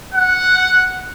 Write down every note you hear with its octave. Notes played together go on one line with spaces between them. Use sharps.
F#5